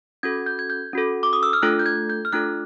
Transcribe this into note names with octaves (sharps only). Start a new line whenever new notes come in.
C#4 F#4 A4 G#6
G6
G#6
G6
C#4 F#4 A4
D6
D#6
E6
F6
A3 D4 F4 A4 F#6
G6
G#6
G6
F6
A3 D4 F4 A4 F#6